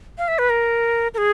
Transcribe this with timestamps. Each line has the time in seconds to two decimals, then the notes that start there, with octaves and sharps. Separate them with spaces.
0.18 F5
0.28 E5
0.39 B4
0.50 A#4
1.14 A#4
1.18 G#4